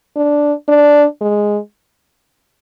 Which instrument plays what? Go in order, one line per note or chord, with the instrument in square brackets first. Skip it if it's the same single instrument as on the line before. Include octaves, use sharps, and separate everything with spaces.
[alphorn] D4
D4
G#3